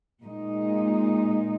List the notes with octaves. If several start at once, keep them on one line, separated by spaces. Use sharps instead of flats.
A#2 G#3 D#4